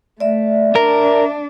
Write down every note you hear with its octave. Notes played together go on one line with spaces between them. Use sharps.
A3 D5 E5
D4 A#4